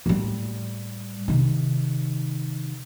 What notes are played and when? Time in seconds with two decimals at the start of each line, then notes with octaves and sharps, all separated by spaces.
0.06 A2 G3
1.28 C3 D#3